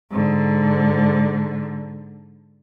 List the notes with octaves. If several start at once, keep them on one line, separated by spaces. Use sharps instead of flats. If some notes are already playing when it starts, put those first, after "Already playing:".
G#2 D3